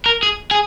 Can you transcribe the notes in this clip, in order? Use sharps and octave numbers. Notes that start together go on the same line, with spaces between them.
A#4
G#4
G#4